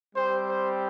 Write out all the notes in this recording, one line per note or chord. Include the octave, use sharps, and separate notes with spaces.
G3 C4 G4 C5
C5